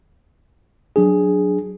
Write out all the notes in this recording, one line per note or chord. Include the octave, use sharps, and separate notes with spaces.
F#3 D4 G#4